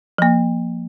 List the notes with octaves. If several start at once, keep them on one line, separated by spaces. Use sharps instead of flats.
F3 A#3